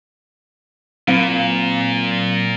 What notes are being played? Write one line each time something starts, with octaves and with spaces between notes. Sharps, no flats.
A#2 F#3 C4 F5